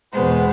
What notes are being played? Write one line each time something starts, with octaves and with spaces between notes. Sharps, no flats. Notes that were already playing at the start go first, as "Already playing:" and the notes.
E2 B2 G#3 B3 C5